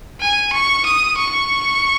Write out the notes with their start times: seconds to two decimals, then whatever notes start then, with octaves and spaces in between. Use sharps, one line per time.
0.21 G#5
0.53 C#6
0.85 D#6
1.17 C#6